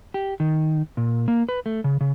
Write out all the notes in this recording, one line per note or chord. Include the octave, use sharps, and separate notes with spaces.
G4
D#3
A#2
A#3
B4
A3
C#3
C#3